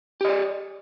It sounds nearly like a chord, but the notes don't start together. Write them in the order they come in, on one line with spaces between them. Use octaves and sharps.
G4 D#5 D5